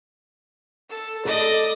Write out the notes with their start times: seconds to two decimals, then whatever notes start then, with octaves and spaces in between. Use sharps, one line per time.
0.90 A4
1.25 A4 D5 D#5